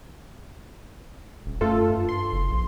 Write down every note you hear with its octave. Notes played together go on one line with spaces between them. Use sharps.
D#1
F#2 A3 F4 A4
G2
C6
F#1
A#1